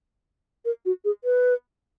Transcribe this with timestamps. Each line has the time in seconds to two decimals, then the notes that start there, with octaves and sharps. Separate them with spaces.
0.65 A#4
0.85 F#4
1.05 G#4
1.24 B4